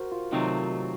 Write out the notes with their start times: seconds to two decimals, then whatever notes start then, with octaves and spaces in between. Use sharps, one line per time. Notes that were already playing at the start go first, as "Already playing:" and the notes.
Already playing: F#4 A#4 C5
0.12 F4
0.32 C3 D#3 F#3 A3 C4 D#4